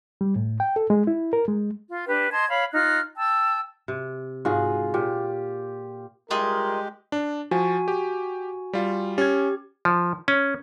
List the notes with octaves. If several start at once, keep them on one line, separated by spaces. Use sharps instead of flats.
G3
A2
G5
A4
G#3
E4
A#4
G#3
F4
D4 G4 B4
D#5 A5 C6 G#6
C#5 F5 B5
D#4 F4 F6 F#6
G5 A5 E6
C3
G#2 F4 F#4 G#4
A#2 G4
G3 G#3 E4 F4 G4 G#4 A#4 D#5
D4
F3 F#4 G#5
G4
G3 F4
C#4 G4 G#6
F3
C#4